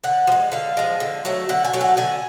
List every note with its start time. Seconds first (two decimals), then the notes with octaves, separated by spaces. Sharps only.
0.04 D3 F#5
0.27 F3
0.32 G#3
0.52 D3 F5
0.77 F3 G#3
1.00 D3
1.25 F#3 A3
1.49 D3 F#5
1.65 G#5
1.73 F#3 A3
1.81 F#5
1.97 D3 G#5